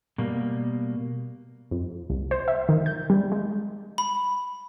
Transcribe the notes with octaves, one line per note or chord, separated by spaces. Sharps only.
B2 G3 A#3
F2
C2
C5
E5
D#3
G6
G3
G#3
B5